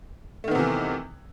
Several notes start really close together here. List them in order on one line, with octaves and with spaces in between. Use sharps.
A3 D#3 B3 C3 E3